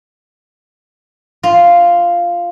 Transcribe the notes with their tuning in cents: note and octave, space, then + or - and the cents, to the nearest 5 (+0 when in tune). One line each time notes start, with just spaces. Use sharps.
F4 -5